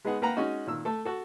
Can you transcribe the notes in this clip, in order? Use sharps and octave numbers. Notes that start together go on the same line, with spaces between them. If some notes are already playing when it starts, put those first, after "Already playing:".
G#3 B3 D#4 G#4 F#5
A#3 B4 F#5 G5 A#5
G#3 C#4 D#4 F#4
A#2 D#3 E6
A3 A4
F#4 A4